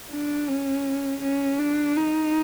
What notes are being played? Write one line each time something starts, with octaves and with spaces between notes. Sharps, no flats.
D4
C#4
C#4
D4
D#4